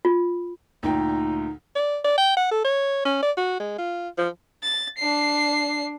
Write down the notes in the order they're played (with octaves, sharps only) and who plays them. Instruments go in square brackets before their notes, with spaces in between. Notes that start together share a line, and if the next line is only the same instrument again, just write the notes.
[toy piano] F4
[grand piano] D2 A#2 G5 [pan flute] D#4
[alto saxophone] D5
D5
G5
F#5
A4
C#5
C#4
D5
F#4
G#3
F4
F3
[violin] A6
D4 C7